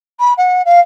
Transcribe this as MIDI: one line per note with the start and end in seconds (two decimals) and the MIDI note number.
0.19 0.33 83
0.37 0.62 78
0.65 0.79 77